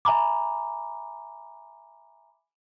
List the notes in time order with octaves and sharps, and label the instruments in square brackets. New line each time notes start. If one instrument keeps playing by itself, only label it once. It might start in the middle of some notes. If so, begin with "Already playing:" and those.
[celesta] E5 G#5 A#5 B5 D6